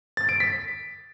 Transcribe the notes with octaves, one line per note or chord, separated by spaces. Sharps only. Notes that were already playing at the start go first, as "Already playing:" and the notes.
A6
D7
B6